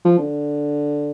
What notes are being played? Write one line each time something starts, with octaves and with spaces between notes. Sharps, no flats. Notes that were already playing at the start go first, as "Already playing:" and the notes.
F3
D3